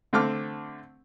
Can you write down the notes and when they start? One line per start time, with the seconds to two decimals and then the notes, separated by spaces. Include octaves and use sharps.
0.13 D3 A3 C4 A5 D6 F6